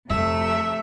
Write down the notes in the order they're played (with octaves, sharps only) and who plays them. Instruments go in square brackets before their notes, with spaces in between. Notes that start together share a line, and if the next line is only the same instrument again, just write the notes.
[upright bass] F2 F3 [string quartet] C3 A3 [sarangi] E5